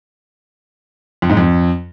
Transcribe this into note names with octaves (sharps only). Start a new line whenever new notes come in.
F2
G#2
F2